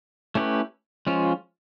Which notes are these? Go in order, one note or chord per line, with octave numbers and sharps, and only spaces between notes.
A3 C#4 E4 G4 B4
F3 G#3 C#4 F4